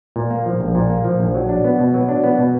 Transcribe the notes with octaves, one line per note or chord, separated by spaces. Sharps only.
A#2
A#3
F3
A#1
A#2
A#3
F3
A#1
F#3
D4
B3
B2
F#3
D4
B3
B2